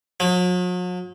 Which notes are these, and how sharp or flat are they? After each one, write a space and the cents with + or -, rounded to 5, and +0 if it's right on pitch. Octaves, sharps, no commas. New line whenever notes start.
F#3 -45